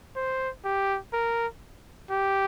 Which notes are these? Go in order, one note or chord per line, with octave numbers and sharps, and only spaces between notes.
C5
G4
A#4
G4